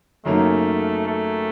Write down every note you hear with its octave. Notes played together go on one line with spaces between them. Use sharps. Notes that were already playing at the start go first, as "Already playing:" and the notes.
F#2 C#3 F#3 A3 A#3 D#4
A3